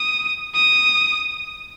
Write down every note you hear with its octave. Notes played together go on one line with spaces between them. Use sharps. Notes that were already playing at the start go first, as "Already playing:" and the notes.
Already playing: D#6
D#6